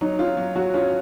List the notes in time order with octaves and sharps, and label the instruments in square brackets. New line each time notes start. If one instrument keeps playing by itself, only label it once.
[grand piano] F#3 [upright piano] D#4
[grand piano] C#4 [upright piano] F4
[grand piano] F#3
[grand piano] F#3 [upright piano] F#4
[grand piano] C#4 [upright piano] F4